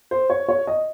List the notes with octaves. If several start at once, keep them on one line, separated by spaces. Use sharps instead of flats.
C5
C#5
C#5
D#5